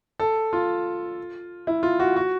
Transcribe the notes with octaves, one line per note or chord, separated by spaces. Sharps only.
A4
F4
E4
F4
F#4
F#4